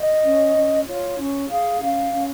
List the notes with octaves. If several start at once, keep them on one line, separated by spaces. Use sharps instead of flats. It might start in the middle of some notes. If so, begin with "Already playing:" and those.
Already playing: D#5
C#4
C#4
F4 C#5
C#4
G#4 F5
C#4 F5
C#4